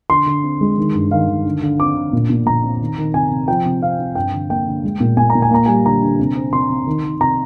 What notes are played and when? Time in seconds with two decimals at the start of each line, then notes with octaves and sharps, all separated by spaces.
0.10 D3 C6
0.26 D3
0.43 C4
0.61 G#3
0.78 D#3
0.95 G2
1.11 D#3 F5
1.28 D#3
1.45 D3
1.62 D3
1.80 C4 D6
1.97 D3
2.13 A#2
2.30 A#2
2.46 A#2 A#5
2.64 C4
2.81 D#3
2.98 D#3
3.14 C3 G#5
3.31 C3
3.48 F3 G5
3.65 C3
3.82 C4 F5
4.00 C4
4.15 G2 G5
4.33 D3
4.50 A#3 G5
4.67 D3
4.84 G#3
5.00 A#2
5.17 A#2 G#5
5.30 A#5
5.35 A#2
5.42 G#5
5.51 A#3 A#5
5.66 G3 G#5
5.85 D3 A#5
6.02 D3
6.19 C3
6.36 C4
6.52 C3 C6
6.70 C3
6.87 D#3
7.04 D#3
7.21 C3 A#5